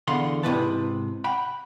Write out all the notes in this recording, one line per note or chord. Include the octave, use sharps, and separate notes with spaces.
E2 D3 F5 F#5 B5 C6
G#2 C3 E3 E4 B4 A5
F#5 G5 B5